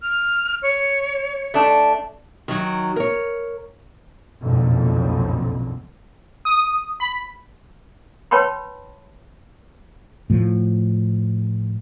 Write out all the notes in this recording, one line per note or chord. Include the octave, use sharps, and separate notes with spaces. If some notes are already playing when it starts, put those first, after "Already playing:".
F6
C#5
A3 D4
D#3 F#3
A#4 C#5
F#1 B1 F2 A#2 D3
D#6
B5
B4 C#5 G5 A5 B5 C6
A2 F3